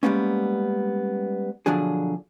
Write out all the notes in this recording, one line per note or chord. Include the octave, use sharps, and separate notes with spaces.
G3 G#3 A#3 B3 C#4
B2 D3 F3 F#3 D4 G#4